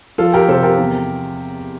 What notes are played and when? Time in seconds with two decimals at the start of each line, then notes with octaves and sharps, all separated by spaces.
0.18 F3 F4 A4
0.33 G4 A#4
0.48 C3 A4 C5
0.63 G4 A#4
0.78 E2